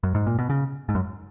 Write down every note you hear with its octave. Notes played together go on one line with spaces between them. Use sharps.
F#2
G#2
A#2
B2
C#3
G#2
F#2